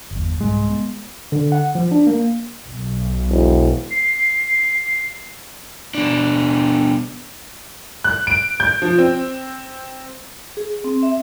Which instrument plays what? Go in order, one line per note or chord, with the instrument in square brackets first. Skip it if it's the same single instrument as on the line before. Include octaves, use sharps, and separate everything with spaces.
[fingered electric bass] G1 E2
[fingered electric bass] C2 G#2 [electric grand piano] G#3
[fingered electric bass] B3
[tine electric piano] D3
F#5
F3
D4
A#3
[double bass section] B1
[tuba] E1
[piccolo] C7
[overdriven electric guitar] B2 D4
[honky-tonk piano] F#6
D7
G6
F3
C4
[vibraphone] G#4
C4
E5